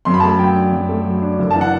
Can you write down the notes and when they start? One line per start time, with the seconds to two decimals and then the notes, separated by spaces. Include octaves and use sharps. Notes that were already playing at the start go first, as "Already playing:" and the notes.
0.05 F#2 C6
0.14 B5
0.20 A5
0.23 A3
0.29 B5
0.39 F#3 G5
0.55 D4
0.72 F#2
0.89 A3
1.06 F#3
1.22 D4
1.39 F#1
1.51 A5
1.56 E3
1.61 F#5